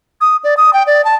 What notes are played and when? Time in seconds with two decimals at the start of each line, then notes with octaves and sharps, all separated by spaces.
0.21 D#6
0.44 D5
0.57 D#6
0.73 G5
0.87 D5
1.05 A5